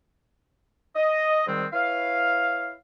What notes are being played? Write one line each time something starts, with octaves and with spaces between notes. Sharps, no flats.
D#5
G#2 D#3 G3 G#3 C4
E4 B4 C#5 F5